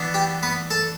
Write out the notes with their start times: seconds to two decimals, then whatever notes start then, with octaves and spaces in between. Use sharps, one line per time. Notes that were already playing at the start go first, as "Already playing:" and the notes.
Already playing: E3 B3 D4
0.14 G4 G5
0.43 B3 B4
0.70 A4 A5